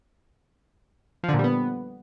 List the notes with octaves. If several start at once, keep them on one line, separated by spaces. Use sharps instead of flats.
F3
D3
A#2
G3
B3